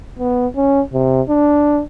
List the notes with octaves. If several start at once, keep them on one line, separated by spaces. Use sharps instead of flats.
B3
C#4
C3
D4